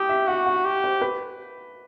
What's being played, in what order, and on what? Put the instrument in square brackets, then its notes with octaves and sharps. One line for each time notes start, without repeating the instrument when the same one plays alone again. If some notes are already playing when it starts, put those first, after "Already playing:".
Already playing: [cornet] G4 [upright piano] D#6
[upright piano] E5
[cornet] F#4 [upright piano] F#5
[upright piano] F#5
[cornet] G4
[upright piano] C5
B4